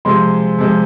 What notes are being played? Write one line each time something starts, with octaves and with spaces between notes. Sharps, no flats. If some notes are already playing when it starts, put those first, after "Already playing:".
C3 F3 G#3 C6
C3 F3 G#3